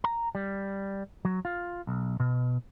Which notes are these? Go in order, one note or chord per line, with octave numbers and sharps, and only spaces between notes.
A#5
G3
F#3
F4
B1
B2